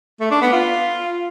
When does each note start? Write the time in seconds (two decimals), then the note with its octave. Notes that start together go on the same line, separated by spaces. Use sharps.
0.21 A3
0.31 D4
0.42 B3
0.53 F4